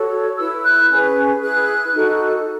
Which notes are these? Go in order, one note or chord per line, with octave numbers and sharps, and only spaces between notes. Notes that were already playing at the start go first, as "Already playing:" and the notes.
Already playing: F#4 A4 C#5
E4 B4 E6
F#6
C#4 G#4 B4
E4 G#4 B4 F#6
D#4 F#4 A4